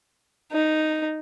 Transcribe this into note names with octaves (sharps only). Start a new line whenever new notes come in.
D#4